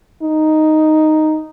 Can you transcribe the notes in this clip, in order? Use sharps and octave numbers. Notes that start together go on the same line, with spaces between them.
D#4